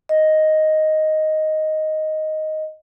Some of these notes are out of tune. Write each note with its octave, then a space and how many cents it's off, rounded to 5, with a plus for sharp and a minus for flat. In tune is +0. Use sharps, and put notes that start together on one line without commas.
D#5 +5